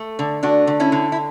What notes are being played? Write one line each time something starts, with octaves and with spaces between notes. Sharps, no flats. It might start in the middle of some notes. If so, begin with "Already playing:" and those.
Already playing: A3
D3
A3 D4 F#4
D3
C#4 E4
D3
E4